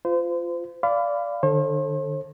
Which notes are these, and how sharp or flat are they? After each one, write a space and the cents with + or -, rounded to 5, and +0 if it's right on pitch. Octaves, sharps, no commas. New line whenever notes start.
F4 -10 C5 -35
D5 -15 F5 -15 B5 +30
D3 +45 A4 +5 C5 +45